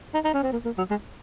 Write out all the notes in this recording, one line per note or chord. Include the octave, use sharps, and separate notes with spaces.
D#4
D#4
C#4
C4
A#3
A#3
F#3
G#3